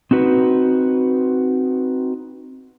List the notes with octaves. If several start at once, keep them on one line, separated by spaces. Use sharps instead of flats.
C4 D#4 F#4 B4